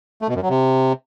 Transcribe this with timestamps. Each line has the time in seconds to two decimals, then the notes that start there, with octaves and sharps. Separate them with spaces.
0.22 A3
0.29 B2
0.35 F#2
0.42 F#3
0.49 C3